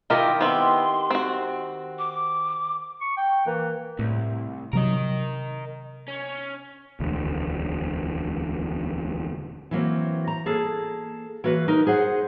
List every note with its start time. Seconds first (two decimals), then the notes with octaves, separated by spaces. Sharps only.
0.10 D#3 E4 F4 G4 A#4 D#5
0.41 B3 C4 E4 C6
1.11 C4 F#4
1.99 D6
3.01 C#6
3.17 G5
3.47 E3 A#3
3.99 C2 A2
4.73 C3 F#3 A#4 D#5
6.08 C#4
7.00 E1 D2
9.71 E3 F#3 A#3 C4
10.27 A#5
10.46 A#3 G#4 A4
11.44 E3 A#3 F#4 B4
11.68 D#4 A#4
11.87 G#4 C5 F#5